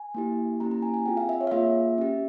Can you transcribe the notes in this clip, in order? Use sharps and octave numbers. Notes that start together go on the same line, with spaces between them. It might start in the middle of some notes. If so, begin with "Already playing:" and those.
Already playing: G#5
A#3 E4 G4
A#3 C#4 E4 G4 A#5
A#5
G#5
G#5
C4 F4 G#4 G5
F5
E5
C#5
F5
A#3 F4 G#4 E5
C#4 G4